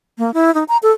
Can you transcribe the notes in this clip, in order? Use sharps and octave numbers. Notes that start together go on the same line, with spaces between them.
A#3
E4
D#4
A#5
A4